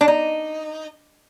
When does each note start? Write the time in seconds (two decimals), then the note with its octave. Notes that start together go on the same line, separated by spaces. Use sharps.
0.01 D4
0.08 D#4